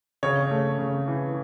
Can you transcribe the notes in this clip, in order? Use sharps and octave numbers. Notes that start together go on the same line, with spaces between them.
C#3 C#5
A3
C#3
E3